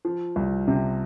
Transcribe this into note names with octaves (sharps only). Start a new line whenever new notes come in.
F3
C2
C3